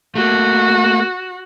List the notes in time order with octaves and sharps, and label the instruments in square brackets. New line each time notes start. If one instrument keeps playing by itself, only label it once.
[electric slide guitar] A3 A#3 [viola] F#4